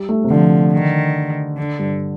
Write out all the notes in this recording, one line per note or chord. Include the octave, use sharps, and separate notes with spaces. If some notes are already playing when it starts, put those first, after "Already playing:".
Already playing: G3
A3
C3
D3 F3
D#3
D3
G2